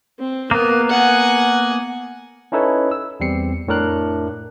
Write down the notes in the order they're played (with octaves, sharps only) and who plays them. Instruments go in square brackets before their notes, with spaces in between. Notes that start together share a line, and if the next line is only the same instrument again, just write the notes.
[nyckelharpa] C4
[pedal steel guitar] A#3 B3 [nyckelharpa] A#4
[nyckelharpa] F#5 G#5
[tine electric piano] C#4 D#4 E4 A4 B4 C#5
E6
E2 G3 C4 C7 C#7
F2 A2 D4 A#4 F#6